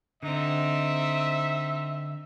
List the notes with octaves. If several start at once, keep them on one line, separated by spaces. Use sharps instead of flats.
D3 C4 D#4 E5